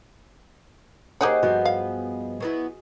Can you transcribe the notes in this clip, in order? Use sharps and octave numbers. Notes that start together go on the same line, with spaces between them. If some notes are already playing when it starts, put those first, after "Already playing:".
A#3 D#4 G4 G#4 C5 C#5 D#5 F#5
G2 F3 B3 F#4
F5
F#3 B3 E4